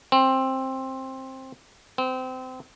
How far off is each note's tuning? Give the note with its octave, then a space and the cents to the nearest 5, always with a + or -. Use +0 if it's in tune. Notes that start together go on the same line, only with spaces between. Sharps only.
C4 +15
C4 -25